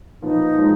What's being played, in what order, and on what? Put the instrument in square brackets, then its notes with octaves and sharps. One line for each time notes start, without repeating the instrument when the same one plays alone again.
[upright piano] A#2 F3 B3 [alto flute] D#4
[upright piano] F3 G#3